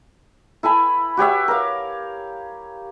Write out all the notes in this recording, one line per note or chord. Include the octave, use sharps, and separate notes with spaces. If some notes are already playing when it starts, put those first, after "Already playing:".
E4 A4 G#5 B5
F#4 G4 C#5 E5
A#4 F5